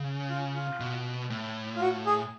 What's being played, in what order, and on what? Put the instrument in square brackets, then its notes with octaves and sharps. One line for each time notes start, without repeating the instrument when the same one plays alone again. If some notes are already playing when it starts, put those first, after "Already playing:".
Already playing: [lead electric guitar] C#3
[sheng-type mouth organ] F4
F4
[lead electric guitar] B2
A2
[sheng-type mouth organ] F4
F#4
G#4